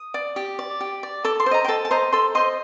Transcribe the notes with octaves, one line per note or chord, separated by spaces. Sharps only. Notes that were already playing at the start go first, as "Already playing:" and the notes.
Already playing: D#6
D5
G4
D5
G4
D5
A4 D6
C6
C5
D#5 A#5
G5
A4 A5
A5
C5 D#5 A#5
A4 C6
C5 D#5 C6